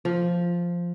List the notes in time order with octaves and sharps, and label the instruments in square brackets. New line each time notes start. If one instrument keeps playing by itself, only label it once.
[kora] F3